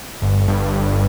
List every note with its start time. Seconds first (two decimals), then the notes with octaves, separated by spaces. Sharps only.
0.22 G1
0.48 G2
0.73 G2